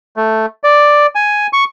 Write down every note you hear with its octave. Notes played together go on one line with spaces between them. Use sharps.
A3
D5
G#5
C#6